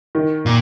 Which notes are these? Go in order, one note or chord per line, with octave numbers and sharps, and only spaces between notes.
D#3
A#2